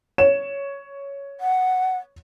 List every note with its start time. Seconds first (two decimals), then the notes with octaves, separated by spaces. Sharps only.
0.18 C#5 E7
1.41 F#5